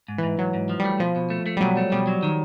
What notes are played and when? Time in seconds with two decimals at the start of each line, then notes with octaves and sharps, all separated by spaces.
0.08 G#2
0.18 E3
0.23 G#2
0.38 G#2 F#3
0.54 G#2
0.69 F3
0.80 G3
0.84 A3
1.00 B2 F3
1.16 B2
1.30 A3
1.46 A3
1.57 G3
1.60 B2 F#3
1.77 A3
1.92 B2 G3
2.07 F#3
2.23 D#3